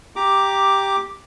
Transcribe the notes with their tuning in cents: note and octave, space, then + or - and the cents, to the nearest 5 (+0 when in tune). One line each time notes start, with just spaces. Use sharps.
G4 +0 A#5 +0 D6 +0